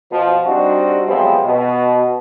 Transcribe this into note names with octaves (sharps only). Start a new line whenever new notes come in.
B2 F3
G3 C4 D4 D#4 F#4
C3 F3 F#3 G#3 B3 C4
B2